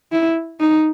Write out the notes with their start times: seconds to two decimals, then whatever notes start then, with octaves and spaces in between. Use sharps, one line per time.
0.12 E4
0.60 D#4